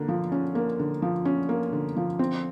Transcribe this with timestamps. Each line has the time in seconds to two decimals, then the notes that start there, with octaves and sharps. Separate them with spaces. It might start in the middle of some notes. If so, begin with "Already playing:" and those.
Already playing: D3 A#3
0.08 F3
0.32 C#4
0.55 A#3
0.79 D3
1.02 F3
1.25 C#4
1.49 A#3
1.73 D3
1.96 F3
2.19 C4